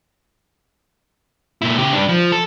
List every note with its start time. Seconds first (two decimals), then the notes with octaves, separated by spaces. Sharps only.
1.62 A#2 E4
1.78 C#3 G4
1.93 G2 D4
2.08 F3
2.32 A4